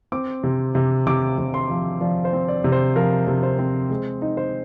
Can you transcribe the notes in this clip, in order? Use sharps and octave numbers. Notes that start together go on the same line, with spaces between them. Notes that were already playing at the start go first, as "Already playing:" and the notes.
C4 D6
C3
C3
C3 D6
C3
C6
F3
F3 D5
C5
C4
D5
C3
C5
F3 A#4
C3
C5
C4
G#3
D#4
C5